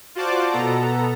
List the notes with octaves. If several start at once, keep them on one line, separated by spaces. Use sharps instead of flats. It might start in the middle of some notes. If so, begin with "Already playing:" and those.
F4 F#4 C5 D5 A5 D6
B2 B3 A4 A#5